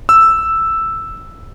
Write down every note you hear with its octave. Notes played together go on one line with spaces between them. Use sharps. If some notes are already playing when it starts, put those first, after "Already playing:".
E6